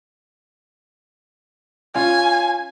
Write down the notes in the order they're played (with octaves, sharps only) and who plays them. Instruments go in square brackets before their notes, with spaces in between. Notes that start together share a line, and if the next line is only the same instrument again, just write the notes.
[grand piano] C#4 F4 [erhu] G#5